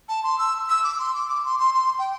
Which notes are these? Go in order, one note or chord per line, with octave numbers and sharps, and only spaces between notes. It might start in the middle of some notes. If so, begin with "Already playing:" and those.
A5
C6
E6
E6
D6
C6
D6
D6
C6
C6
C6
G5